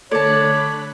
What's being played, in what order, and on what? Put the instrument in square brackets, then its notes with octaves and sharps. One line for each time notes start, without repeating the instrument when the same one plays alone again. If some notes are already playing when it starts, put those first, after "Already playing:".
[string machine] D3 B5 F#6 [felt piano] A3 [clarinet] C#5 [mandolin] D5 A5